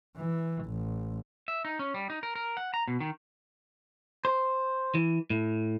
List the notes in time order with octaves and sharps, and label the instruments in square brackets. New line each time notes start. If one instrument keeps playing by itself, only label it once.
[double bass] E3
A1
[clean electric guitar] E5
D#4
C#4
G3
D#4
A#4
A#4
F#5
A#5
B2
D#3
C5
E3
A2